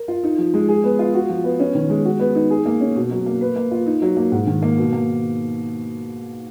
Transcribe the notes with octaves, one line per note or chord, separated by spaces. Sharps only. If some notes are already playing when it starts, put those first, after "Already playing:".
Already playing: A#4
F4
D#4
F3
G#3
G#4
B3
F4
F#4
F3
B3
C#4
D#3
G#3
F#4
B3
D#4
G#4
A#3
C#4
B2
F#3
A#3
B4
A#3
F4
D#4
F#3
A#3
G#2
D#3
A#3
B2
A#3